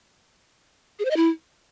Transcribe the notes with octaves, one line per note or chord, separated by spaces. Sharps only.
G#4
C5
D#5
E4